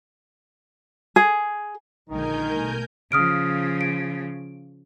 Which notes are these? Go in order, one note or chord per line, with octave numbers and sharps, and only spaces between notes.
G#4
A#1 D3 D#3 G#3 D#4 A#4 G#5 G6
B2 G3 A3
C#3 F3 D#6 F6 D7
D7